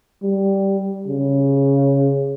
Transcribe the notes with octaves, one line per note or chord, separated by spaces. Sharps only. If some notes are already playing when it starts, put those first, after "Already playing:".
G3
C#3